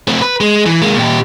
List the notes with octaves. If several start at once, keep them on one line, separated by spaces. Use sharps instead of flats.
A3 C4
B4
G#3
E3
G#3 A#3
A#2 G4